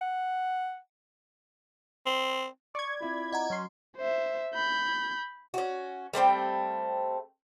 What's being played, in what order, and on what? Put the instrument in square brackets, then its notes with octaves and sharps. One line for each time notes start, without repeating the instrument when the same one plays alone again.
[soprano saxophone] F#5
[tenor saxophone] C4
[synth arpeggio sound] D5 G#6 [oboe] C#6
[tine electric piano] C4 E4 F4 [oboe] B5
[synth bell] D#5 F#5 A#5
[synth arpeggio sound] F#3 C6 [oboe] C#4
[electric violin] C5 E5
B5 G6
[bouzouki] C#4 F#4
G3 A3 C4 G5